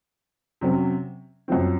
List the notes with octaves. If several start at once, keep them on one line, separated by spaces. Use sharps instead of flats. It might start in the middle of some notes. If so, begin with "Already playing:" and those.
C3 F#3 C#4
F#2 F3 C4